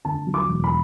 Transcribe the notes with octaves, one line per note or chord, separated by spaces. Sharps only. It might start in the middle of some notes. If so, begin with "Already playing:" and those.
D3 A5
F#3
D6
E1
B5